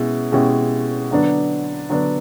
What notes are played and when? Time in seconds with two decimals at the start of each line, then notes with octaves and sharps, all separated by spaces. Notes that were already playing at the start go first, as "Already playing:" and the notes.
Already playing: B2 G#3 C#4 E4
0.32 B2 G#3 C#4 E4 G4
1.11 D3 F#3 B3 D4
1.89 D3 F#3 B3 D4